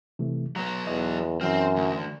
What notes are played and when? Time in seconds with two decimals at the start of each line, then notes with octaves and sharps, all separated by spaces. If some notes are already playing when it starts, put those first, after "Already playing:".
0.19 C3 E3 A3
0.56 F#3 B3 A#5
0.87 E2 D#5
1.41 F#2 E3 C4 F6
1.76 D2